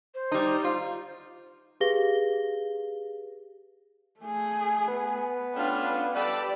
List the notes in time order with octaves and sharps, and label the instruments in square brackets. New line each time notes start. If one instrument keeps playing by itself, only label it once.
[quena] C5
[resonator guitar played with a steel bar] G3 D#4
F4
[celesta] G4 G#4 B4 F5 A#6 G7
[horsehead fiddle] A3 G#4
[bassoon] B3
[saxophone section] A3 C#4 F4 [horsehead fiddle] D4 [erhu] G5
[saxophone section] G3 G4 A4 [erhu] D5 [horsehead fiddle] B5